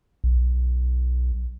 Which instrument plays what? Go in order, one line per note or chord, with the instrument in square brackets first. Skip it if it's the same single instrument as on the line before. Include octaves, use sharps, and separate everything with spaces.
[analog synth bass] B1